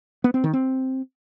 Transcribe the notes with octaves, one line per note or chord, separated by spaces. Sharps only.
B3
C4
D#3
C4